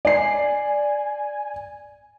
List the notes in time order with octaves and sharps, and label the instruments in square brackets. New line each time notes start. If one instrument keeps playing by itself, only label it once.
[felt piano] D5 C7 [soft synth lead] G#5